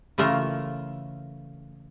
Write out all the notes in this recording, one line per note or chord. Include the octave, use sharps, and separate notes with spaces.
C#3 E3 A3 F4 A#4